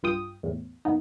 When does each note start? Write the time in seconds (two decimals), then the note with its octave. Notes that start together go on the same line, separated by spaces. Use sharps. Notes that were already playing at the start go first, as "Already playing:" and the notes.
0.03 B1 G2 F4 G5 D#6
0.43 E2 A2
0.85 F#2 A#3 B3 D#4